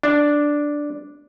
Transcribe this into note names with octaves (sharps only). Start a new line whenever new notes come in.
D4